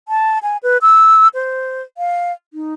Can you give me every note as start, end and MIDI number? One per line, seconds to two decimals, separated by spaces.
0.08 0.39 81
0.43 0.57 80
0.63 0.78 71
0.82 1.28 88
1.34 1.82 72
1.98 2.32 77
2.53 2.74 63